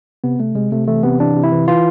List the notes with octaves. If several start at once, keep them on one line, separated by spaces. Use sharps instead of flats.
C3 B3
C3 A3
C3 G#3
C3 A3
E3 A3
C3 B3
E3 D4
C3
E4
E3
E3 F4